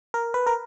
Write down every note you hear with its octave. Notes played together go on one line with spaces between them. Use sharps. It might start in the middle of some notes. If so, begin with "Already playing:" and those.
A#4
B4
A#4